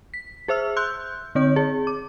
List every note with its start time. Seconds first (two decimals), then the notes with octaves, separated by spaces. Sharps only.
0.14 B6
0.48 G#4 C5 E5 E6 F6
0.77 C6 E6 F#6 G6
1.35 D3 C4 C#5 G6
1.56 G#4
1.87 D6